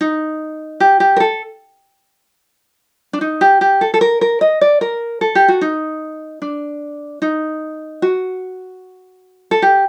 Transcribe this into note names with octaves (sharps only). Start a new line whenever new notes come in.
D#4
G4
G4
A#4
A4
D4
D#4
G4
G4
A4
A4
A#4
A#4
D#5
D5
A#4
A4
G4
F#4
D#4
D4
D#4
F#4
A4
G4